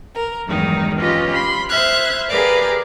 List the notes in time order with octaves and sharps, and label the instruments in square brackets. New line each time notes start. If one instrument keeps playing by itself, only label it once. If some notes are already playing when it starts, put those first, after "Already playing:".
[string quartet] A#4
E2 G2 D#3 F#3 G#3 D#4
C#4 F4 G4 B4 D#5
B5 C6
C5 E5 F6 F#6 G#6
G4 G#4 A#4 B4 D5 F5